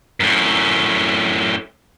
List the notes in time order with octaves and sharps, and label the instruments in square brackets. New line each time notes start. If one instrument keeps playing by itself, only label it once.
[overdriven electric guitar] F#2 A2